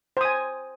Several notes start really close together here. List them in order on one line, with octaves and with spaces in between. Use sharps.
C5 D#6 G#5